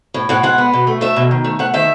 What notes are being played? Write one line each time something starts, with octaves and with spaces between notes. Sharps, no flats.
A2
A2 F#5
G#3 F#5
B3
B2
A3
A3 E5
B2
D#3
A3
A3 F#5
D#3 E5